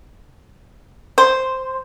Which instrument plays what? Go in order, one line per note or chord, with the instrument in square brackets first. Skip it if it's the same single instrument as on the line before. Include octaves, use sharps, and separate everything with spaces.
[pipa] C5